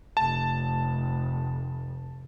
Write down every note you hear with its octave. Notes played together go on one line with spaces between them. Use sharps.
F1 A5